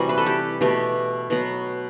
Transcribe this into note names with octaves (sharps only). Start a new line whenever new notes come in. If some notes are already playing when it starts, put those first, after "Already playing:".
Already playing: C3 E3 G3 A3 F#4
B4
A4
G4
B2 A3 G4
B2 F#3 B3